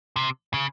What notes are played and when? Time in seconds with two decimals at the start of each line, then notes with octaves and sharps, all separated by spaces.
0.16 C3
0.54 C#3